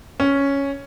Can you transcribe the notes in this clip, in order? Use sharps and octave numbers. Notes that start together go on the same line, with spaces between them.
C#4